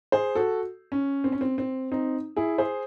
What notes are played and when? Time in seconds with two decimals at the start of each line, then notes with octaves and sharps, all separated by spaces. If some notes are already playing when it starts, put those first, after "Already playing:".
0.12 G#4 C5
0.35 F#4 A4
0.92 C#4
1.24 C4
1.32 C#4
1.41 C4
1.58 C4
1.92 C4 D#4
2.36 E4 G#4
2.58 G#4 C5